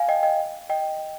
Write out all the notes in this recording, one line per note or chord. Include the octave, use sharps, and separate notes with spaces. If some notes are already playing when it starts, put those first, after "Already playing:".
Already playing: F5 G#5
D#5 G5
D#5 G5
D#5 G5